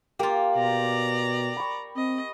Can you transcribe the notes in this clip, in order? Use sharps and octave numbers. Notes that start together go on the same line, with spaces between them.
A#3 F4 G4
B2 D5 A#5
B5 C#6
C4 D#5